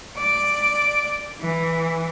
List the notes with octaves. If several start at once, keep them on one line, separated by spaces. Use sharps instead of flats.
D5
E3